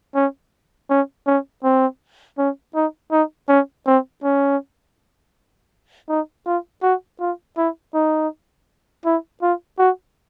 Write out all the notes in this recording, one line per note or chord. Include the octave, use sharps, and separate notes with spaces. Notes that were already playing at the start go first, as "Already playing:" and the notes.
C#4
C#4
C#4
C4
C#4
D#4
D#4
C#4
C4
C#4
D#4
F4
F#4
F4
E4
D#4
E4
F4
F#4